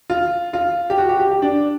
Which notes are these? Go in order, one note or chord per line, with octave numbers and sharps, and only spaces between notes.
F4
F4
G4
F#4
G4
G4
G4
D4